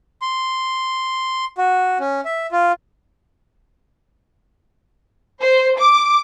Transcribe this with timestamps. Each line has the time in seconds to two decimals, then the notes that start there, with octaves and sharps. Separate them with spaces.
0.22 C6
1.58 F#4
2.00 C#4
2.25 E5
2.52 F4
5.40 C5
5.78 D6